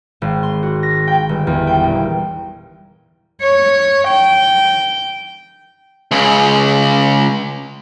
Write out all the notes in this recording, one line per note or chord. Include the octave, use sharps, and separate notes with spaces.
G#1
C6
F#4
A#6
G5
G1
E2
G5
D#1
C#5
G5
C#2 C#3